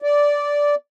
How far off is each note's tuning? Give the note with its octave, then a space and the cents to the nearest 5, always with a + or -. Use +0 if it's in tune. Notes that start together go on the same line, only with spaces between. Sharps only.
D5 -10